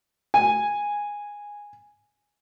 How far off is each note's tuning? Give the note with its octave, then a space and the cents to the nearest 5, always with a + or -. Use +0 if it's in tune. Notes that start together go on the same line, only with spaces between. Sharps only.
G#5 -10